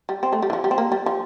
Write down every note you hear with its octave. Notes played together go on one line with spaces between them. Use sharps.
G3
C4
A3
G3
E3
F3
G3
C4
A#3
G3
F3